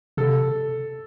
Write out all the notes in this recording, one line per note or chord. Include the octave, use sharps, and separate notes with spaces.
C3 A4